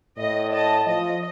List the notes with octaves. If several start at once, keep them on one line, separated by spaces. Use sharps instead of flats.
A2 D#5
D#5 A5
F3 D#5